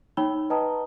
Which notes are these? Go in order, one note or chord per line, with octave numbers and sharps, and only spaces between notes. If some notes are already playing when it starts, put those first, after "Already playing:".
D#4 C#5 G5 B5 E6 G7
B4 D#5 G5 A5 A#5 D#6